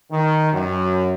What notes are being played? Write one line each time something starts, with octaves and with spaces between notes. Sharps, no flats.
D#3
F#2